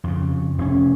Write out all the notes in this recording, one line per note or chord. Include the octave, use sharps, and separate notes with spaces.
F2 C#3
F1 C4 C#4